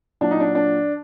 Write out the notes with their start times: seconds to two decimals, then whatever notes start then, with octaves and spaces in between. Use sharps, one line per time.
0.21 A#2 F#3 D4
0.31 D#4
0.40 D4
0.55 D4